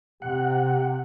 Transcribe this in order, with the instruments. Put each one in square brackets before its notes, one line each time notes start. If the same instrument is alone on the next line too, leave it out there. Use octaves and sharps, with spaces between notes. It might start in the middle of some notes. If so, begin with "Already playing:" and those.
[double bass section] C3 [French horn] G4 [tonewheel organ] F#5